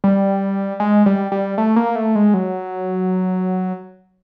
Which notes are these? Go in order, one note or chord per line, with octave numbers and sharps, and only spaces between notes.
G3
G#3
G3
G3
A3
A#3
A3
G#3
F#3